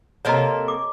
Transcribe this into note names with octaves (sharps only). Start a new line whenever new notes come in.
C3 A#3 A4 C#5 D#5 A#5
D6